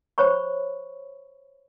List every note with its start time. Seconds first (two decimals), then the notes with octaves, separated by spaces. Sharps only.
0.18 C5 C#5 B5 C#6